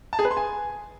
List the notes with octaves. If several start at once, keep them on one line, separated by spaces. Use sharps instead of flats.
A5
G#4
B4
C6
G#5